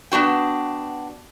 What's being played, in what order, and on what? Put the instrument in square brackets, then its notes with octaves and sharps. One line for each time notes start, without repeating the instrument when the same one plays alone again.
[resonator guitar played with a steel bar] B3 D4 F#4 G5